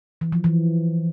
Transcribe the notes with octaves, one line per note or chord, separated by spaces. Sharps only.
E3
F3
E3